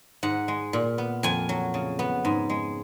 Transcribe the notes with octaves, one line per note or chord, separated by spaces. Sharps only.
G#2 F#5
G#3
A#2
B3
F2 G#5
F#3
C#3
B3
G#2
G#3